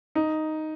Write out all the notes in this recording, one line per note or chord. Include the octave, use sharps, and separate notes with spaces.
D#4